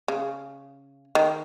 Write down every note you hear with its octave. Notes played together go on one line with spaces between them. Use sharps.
C#3
D#3